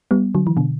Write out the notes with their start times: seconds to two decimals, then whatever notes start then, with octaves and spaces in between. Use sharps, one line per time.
0.11 G3 B3
0.35 D3 F#3
0.47 E3
0.57 B2 D3